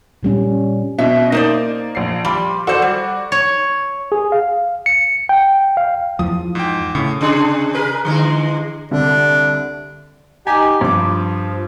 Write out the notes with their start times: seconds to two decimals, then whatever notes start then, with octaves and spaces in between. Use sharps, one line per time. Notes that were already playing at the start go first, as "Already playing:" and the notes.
0.23 A#2 G3 C#4
0.98 B2 C#4 E5
1.32 A#3 D#4 C5 D5
1.95 A#1 C7
2.25 F3 G3 B5
2.67 F#4 A4 C5 D5
2.82 G3
3.32 C#5
4.12 G#4
4.32 F5
4.86 C#7
5.29 G5
5.77 F5
6.19 E2 F3 D#6
6.55 G#2 G5
6.95 A2 C#3
7.21 C3 D4 G#4
7.75 G#4 A#4 B4
8.05 D3 E3 G#3
8.91 C2 D3 D4
10.47 D#4 G4 G#5
10.81 G2 F3 D6